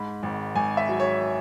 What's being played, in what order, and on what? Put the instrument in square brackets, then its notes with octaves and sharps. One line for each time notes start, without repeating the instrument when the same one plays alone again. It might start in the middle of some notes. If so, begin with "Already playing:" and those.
Already playing: [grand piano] G#2 B5
G#1
G#1 G#5
E5
F#3
C#5